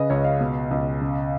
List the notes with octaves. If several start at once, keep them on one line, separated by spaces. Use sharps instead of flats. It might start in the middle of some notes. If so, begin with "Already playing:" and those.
Already playing: C#3 B4 D#5
C#2 C#5
F5
B2
C#2
C#3